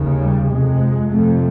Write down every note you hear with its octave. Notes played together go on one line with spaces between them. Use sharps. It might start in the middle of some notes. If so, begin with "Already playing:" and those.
Already playing: D#2 C#3
G3
F2 C3 G#3
F2 C3 A3